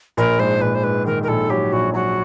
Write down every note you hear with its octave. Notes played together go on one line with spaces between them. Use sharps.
A#1 A#4
G#2 C5
A#1 B4
C5
G#2 B4
D#3 A#4
A#4
A#1 A4
F#3 G4
A#1 F#4
F#3 F#4